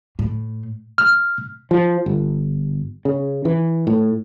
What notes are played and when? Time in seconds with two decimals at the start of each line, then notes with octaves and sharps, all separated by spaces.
0.19 A2
0.98 F6
1.71 F3
2.06 G1
3.05 C#3
3.45 E3
3.87 A2